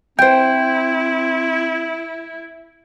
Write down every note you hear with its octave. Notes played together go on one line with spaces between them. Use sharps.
C4 E4 C5 G5 G6